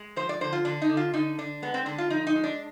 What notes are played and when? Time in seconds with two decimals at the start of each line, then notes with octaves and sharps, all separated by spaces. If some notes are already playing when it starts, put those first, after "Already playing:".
Already playing: G#3
0.16 F3 C5
0.29 D5
0.41 D3 C5
0.53 F4
0.65 D3 D4
0.82 D#4
0.89 D3
0.97 F4
1.13 D3 D#4
1.38 D3 D4
1.62 G#3 B3
1.74 C4
1.86 D3 D4
1.98 F4
2.10 F3 D#4
2.27 D#4
2.36 G#3
2.44 D4